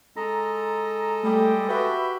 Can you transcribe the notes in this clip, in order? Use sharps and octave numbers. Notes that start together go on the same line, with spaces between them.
G#3 A4 D#5 A#5
G3 A3 G4
F#4 G4 B4 E5